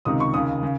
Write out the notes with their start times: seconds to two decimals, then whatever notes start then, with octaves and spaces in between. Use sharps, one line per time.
0.05 C#2 C3 D#3 D#6
0.20 C#6
0.34 D#2 C#3 D#6
0.63 C#3